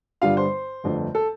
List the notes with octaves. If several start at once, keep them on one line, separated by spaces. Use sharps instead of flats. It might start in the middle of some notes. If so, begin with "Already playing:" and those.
G1 G2 D3 G3 F4 F5
C5
G1 F2 D3 A3
A4